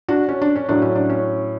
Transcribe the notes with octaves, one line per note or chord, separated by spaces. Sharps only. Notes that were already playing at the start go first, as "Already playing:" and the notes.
D4 F#4
C#4
D4
C#4
A2 F#3 D4
C#4
D4
C#4